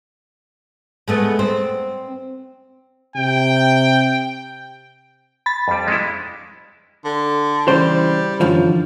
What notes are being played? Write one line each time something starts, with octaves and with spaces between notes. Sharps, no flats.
G#3 A3 B3
C4
C3 G5
B5 A6
F2 G3
G#3 C#4 E4
D3
C#3 E3 G3 E4 C5
F#2 D3 E3 F3